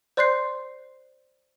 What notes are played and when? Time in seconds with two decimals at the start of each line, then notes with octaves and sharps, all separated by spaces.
0.17 C5 D5 C6 F#6 G6 C7